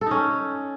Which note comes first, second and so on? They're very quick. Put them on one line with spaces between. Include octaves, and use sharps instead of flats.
A4 D#4 C#4